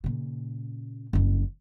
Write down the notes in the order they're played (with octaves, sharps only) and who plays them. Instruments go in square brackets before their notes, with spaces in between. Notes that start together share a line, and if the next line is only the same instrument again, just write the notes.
[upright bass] A#2 C#3
F#1 F2